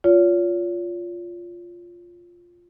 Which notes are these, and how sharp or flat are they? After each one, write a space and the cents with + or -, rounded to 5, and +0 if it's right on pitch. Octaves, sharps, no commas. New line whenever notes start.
F4 +0 C#5 +40